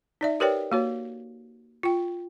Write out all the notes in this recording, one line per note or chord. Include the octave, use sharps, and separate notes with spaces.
D#4 D5 E5
G4 A#4 B4 C#5 D5 G5
A#3 F#4 C#5
F4 G5